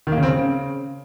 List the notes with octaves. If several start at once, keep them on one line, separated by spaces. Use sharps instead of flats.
D#3
A#3
C#3
C4
C#3